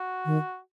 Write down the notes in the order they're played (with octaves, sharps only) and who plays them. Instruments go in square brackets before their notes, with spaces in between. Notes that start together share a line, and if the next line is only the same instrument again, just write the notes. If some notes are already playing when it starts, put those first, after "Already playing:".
Already playing: [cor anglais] F#4
[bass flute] D#3